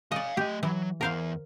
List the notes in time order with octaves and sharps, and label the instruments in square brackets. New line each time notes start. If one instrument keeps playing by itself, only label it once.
[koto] D5 D#5 [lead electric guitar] F5 G#5
[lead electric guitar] A3 D#5 [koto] G4
[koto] E3 [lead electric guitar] F#3
[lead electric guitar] E2 E3 [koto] A#4 C5 F5